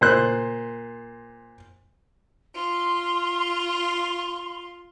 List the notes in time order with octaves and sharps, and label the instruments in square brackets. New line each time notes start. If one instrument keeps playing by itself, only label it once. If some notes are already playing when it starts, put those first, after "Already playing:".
[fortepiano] A#2 C5 F#6
[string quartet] F4 [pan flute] C6